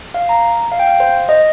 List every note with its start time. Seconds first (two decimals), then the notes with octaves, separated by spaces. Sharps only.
0.14 F5
0.29 A#5
0.72 F5
0.79 G5
0.87 F5
1.00 C5
1.29 D#5